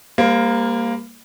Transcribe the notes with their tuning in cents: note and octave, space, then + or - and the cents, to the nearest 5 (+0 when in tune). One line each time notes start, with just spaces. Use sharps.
G3 +40 A#3 +0 C5 -25